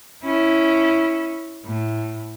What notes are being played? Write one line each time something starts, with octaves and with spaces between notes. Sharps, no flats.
C#4 E4
A2